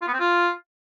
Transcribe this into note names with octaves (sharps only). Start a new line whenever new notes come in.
F4
B3
C4
F4